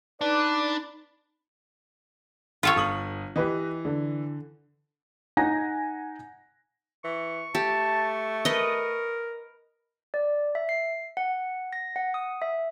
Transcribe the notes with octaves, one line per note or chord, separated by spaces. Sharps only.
D4 D#4 B4 D5
F4 A4 C#5
G1 D#6 F#7
E3 G4 B4 D#5
D3
D#4 F#5 G#5 A#6
E3 C#6
A3 G4 A5
A#4 B4 D#5
D5
E5
C7
F#5
A#6
F#5
D#6
E5